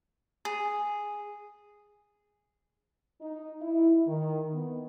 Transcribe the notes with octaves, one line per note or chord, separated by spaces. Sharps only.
G#4
D#4
E4
D#3
B3